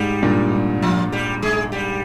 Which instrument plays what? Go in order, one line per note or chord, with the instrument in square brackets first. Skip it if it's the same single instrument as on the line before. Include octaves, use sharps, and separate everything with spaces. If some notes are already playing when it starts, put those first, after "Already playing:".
Already playing: [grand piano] G#2 [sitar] G3 G4
[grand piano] G2 A#2
G2
[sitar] F3 F4
G3 G4
G#3 G#4
G3 G4